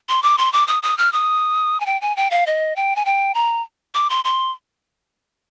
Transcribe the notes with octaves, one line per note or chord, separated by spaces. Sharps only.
C6
D6
C6
D6
D#6
D#6
F6
D#6
G#5
G5
G#5
G5
F5
D#5
G5
G#5
G5
A#5
D6
C6
C6